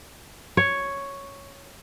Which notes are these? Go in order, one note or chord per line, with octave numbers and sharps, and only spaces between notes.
C#5